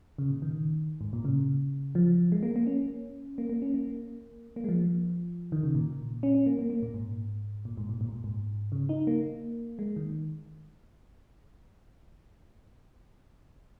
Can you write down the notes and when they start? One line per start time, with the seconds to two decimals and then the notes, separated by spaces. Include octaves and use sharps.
0.18 C#3
0.30 A#2
0.42 D#3
1.01 G#2
1.13 A#2
1.25 C#3
1.95 F3
2.32 G#3
2.43 A#3
2.56 A#3
2.67 C#4
3.38 A#3
3.49 A#3
3.62 C#4
3.74 A#3
4.56 A#3
4.64 G#3
4.69 F3
5.52 D#3
5.63 C#3
5.75 A#2
6.23 C#4
6.35 C#4
6.46 A#3
6.59 A#3
6.70 A#3
6.82 A#2
6.94 G#2
7.65 A#2
7.77 G#2
7.89 A#2
8.01 A#2
8.09 G#2
8.24 G#2
8.72 C#3
8.89 D#4
9.07 A#3
9.79 G#3
9.96 D#3